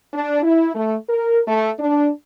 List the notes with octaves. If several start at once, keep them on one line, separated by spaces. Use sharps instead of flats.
D4
E4
A3
A#4
A3
D4